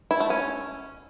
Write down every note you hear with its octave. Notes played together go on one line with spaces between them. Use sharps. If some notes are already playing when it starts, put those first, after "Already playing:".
E4
A3
C#4